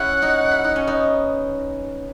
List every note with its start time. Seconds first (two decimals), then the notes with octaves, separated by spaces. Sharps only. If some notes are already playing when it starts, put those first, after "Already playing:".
Already playing: C#4 E4 G#4 F#5
0.22 D#4 F#4
0.51 E4
0.64 D#4
0.76 C#4
0.87 B3 D#4